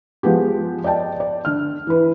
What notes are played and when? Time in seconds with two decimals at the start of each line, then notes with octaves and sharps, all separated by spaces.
0.23 F3 G#3 B3 G4
0.84 D5 D#5 G5 A5
1.20 D5
1.45 D3 F6
1.87 E3 B4